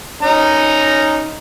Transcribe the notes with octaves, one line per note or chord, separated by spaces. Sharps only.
C#4 D#4 A#5